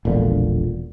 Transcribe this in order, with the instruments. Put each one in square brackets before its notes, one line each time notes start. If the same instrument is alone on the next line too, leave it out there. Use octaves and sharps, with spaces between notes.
[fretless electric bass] E1 A#1 A#2 D3